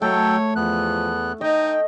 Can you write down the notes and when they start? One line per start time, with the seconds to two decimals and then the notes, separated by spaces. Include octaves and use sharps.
0.02 F#3 A3 A4 C#5 G5
0.56 E2 F3 B3 F#6
1.41 D#4 D#5 G5